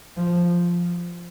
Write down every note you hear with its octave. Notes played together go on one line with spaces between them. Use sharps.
F3